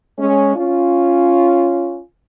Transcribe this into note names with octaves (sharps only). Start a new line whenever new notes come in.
G#3 C#4
C#4 F4